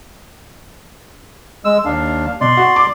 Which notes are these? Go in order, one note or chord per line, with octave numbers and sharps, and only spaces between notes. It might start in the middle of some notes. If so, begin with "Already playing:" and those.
G#3 E6
D#2 D4 F5
B2 D5 C6
F#4
D6